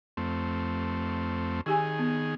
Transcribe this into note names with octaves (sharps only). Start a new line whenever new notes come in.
F2 A3 C4
D#3 D#4 G4 G#4 G#5
B3